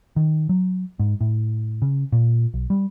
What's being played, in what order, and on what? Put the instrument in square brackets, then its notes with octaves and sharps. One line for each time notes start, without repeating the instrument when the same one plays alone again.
[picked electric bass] D#3
F#3
G#2
A2
C#3
A#2
B1
G3